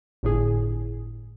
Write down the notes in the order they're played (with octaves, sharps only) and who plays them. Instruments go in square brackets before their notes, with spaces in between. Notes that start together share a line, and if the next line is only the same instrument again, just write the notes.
[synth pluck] G1 A2 G#4